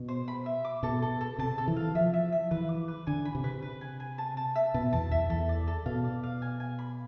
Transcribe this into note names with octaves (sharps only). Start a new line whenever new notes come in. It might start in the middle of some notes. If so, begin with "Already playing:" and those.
Already playing: B2
C5
B5
E5
D6
B2 A4
A4
A4
C3 A5
A4
E3
F5
F3 E5
E5
E5
E3 B4
D6
B4
D3 G#5
B5
C3
B4
B4
G#5
G#5
A5
A5
E5
B2 A5
E2 A5
E2 E5
E2 A4
D5
A4
B2 F5
D5
F5
G#5
G#5
B5